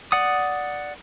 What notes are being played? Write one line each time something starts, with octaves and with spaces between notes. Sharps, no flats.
D5 F#5 D#6